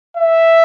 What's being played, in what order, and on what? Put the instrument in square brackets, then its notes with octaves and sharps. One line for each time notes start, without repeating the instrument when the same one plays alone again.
[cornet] E5